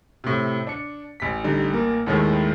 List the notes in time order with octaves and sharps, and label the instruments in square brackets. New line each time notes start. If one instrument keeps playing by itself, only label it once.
[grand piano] A2 C3
D4 C#7
A1 B6
[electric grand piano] D3 G3 D#4
A#3 A#4
[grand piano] D#2 A2 C#5 [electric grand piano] D#3 G#3 E4